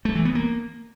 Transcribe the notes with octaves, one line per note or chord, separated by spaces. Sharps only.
A3
E3
B3
A#3